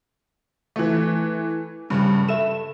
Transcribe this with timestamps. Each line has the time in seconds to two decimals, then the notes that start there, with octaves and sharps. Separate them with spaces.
0.76 E3 A3
1.90 G2 C#3 G3
2.29 A4 E5 E7